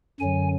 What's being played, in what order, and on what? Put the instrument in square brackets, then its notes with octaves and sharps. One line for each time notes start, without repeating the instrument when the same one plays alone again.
[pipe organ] F#2 D3 F#3 G#5